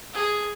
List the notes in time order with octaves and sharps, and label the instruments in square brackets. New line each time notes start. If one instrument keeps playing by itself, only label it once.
[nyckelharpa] G#4